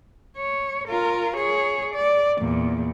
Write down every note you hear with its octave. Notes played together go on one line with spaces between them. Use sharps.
C#5
F4 A#4
G#4 C#5
D5
E2 A#2